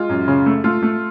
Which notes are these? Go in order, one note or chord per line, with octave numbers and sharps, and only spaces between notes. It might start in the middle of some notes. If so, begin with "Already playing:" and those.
Already playing: G#3 F4
F#2
C#3
A3
A3 F4
A3